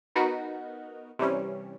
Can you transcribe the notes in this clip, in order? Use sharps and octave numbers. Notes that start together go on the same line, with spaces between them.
B3 D#4 F#4 A#4 B4
C3 E3 G3 C#4